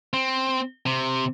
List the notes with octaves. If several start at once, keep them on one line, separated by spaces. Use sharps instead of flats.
C4
C3